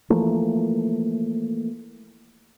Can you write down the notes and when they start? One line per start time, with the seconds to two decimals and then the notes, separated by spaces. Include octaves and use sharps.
0.10 E3 F3 A3 A#3